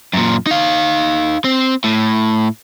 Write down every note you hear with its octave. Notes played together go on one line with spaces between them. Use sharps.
F#2 A#2
D#4 F5
C4
A2